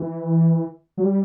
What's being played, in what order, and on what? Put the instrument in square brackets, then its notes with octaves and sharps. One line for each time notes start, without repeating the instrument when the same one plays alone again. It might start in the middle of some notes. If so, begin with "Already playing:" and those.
Already playing: [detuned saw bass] E3
F#3
G3